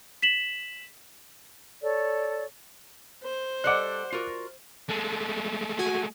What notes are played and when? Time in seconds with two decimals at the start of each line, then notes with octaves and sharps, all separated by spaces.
0.22 B6 E7 F#7
1.81 A4 C#5 D5
3.23 C5
3.64 G3 A4 D5 D#5 F#5 D6 F#6
4.12 F4 F#4 A#4
4.89 G#3 A3
5.79 F#4 G#5